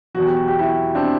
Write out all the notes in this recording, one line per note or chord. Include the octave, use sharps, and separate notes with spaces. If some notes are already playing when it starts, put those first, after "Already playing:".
E2 B2 F#3 F#4
G4
F#4
G4
E4 F#4
C4 D4